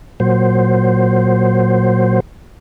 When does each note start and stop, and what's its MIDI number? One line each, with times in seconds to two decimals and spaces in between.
0.20 2.20 46
0.20 2.20 54
0.20 2.20 72